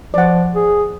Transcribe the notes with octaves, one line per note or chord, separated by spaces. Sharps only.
F3 D5 F#5
G#4